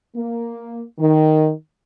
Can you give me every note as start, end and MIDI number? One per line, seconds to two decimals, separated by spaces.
0.15 0.82 58
0.99 1.50 51